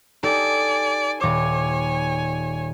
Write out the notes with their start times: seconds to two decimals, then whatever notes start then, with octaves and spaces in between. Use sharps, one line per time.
0.23 D#4 G4 A4 D5 G#5
1.21 D#1 C#5 G#5 D6